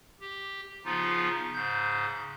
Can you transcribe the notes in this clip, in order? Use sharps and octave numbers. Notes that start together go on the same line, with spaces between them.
G4
C#3 F3 B3 D#4 F4
G#2 C#3 G6